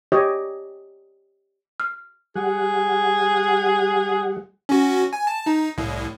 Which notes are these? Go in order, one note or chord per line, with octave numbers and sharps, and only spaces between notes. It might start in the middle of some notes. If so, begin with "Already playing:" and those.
G4 C#5 D#5
F6
G3 G4 G#4 F#5
C#4 F#4
G#5
A5
D#4
C2 A2